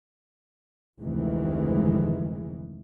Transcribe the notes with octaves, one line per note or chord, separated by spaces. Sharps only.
F1 D2 D#3 E3 G#3